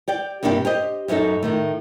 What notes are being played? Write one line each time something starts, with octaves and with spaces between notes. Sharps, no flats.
G4 D5 G5
G2 C3 A#3 D4 E4 G4
G4 C5 D#5
F#2 F#3 C#4 D#4 A4
A2 D#3 A3